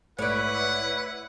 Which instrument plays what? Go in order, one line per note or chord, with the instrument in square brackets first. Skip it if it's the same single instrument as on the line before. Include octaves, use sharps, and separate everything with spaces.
[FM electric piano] A#1 G#2 A3 [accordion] E4 B4 [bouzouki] C#5 D5 [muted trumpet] F#5